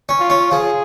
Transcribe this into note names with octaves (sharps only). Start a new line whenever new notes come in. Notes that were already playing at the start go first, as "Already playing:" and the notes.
C#4
F4
C#4
F3 G#4